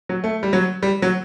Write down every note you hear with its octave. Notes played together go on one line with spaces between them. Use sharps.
F#3
A3
G3
F#3
G3
F#3